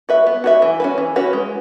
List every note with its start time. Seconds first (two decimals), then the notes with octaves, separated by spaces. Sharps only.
0.09 F#4 B4 E5
0.27 B3
0.44 F#4 B4 E5
0.62 E3
0.80 C#4 F#4 B4
0.98 E3
1.16 C#4 F#4 B4
1.33 G#3